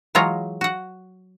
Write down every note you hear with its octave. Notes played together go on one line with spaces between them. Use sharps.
E3 F#3 G#3 F4 C#5 A#5
F#4 F#5